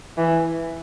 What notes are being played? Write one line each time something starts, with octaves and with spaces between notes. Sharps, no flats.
E3